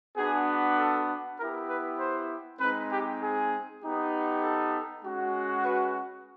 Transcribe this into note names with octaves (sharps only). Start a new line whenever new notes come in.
B3 D4 F#4 G#4
A4
B3 E4 G4 A#4
B4
C5
G#3 C4 D#4 B4
G4
G#4
B3 D#4 G4
A4
G#3 C#4 F#4
B4